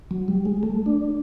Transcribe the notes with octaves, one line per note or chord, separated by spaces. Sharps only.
F#3
G3
G#3
A3
D4